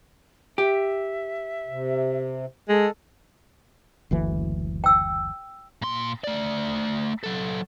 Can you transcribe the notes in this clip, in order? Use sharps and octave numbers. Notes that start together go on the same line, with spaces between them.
G4 E5
C3
G#3 A4
F#1 D2 E3
G5 E6
A#2 C6
A3 D5
F#3 A4